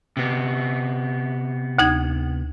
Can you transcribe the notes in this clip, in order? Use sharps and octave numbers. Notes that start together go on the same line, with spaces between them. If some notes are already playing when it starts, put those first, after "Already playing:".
C3 B3
D2 D#4 G#6